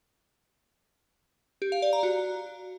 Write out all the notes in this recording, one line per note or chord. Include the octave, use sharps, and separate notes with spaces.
G4
F5
D5
A#5
F#4